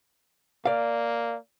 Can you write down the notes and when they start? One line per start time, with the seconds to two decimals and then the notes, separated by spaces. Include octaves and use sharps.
0.66 A#3 D5 F5